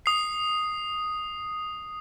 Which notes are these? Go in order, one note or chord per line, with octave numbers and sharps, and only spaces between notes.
D#6 C7